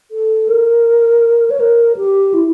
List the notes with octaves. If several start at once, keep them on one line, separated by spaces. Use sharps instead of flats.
A4
A#4
C#5
A#4
G4
E4